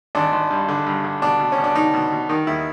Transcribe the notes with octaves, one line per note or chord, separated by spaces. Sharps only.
G#1 D4
G#1
G2
D3
G2
D3
B2 D4
B2
C#4
B2
D4
B2 D#4
B2
B2
D#3 D#4
D#2 E4